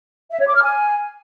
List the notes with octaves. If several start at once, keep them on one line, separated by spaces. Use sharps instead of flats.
E5
C#5
D6
F6
G#5